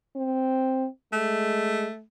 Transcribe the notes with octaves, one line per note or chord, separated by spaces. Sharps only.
C4
G#3 A3